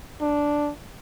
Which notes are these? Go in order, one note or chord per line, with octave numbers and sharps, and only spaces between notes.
D4